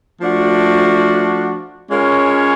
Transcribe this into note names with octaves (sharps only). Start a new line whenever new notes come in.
F3 A3 D4 F#4
G#3 C#4 F4 A#4 C#5